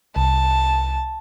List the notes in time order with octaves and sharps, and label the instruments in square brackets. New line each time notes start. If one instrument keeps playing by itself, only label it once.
[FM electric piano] C2 [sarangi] A5